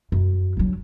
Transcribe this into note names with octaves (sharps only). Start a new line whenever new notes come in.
F#2
D3 F#3